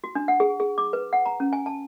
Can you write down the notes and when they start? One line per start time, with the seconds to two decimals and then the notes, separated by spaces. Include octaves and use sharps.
0.04 F#4
0.15 D4
0.28 F#5
0.40 G#4
0.60 G#4
0.78 D6
0.93 B4
1.13 F#5
1.26 A#5
1.40 C#4
1.53 G#5
1.66 A5